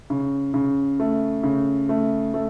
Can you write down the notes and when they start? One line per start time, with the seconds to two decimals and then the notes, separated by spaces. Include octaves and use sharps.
0.10 C#3
0.54 C#3
1.00 A3
1.43 C#3
1.89 A3
2.34 A3